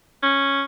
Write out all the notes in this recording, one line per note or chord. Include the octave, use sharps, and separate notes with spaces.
C#4